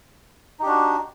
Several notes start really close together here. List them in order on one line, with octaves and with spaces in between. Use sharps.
D#4 G4 D4 F#4